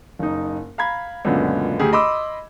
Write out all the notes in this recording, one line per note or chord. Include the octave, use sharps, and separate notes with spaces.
F#1 D#4
F5 A#5 B5 G#6
C#2 F#2 A#2 D3 B3
D2 G4 G#4
D#5 B5 C6 D6 E6